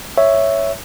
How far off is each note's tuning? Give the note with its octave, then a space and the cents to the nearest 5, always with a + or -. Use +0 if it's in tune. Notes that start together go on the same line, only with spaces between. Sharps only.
C#5 +0 E5 +0